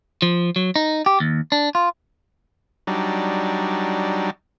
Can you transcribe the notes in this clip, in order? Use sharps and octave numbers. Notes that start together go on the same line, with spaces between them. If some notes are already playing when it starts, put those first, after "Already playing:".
F3
F#3
D#4
G4
D#2
D4
F4
F#3 G3 D4 D#4